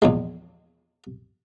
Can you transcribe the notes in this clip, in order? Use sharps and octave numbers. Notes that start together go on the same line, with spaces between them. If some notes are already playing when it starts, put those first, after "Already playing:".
A#1 E2 G#3